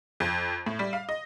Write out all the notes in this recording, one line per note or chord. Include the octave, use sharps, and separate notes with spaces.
F2
A2
G3
F5
D#5